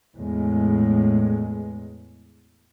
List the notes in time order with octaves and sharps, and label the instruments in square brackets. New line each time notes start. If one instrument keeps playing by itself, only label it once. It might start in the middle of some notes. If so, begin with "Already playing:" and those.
[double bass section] E2 A2 G#3